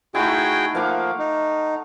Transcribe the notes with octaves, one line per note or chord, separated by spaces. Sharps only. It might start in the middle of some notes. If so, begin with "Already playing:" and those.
A3 D#4 E4 F#4 G#4 G5
F3 A#3 F5 F#5 D6
D#4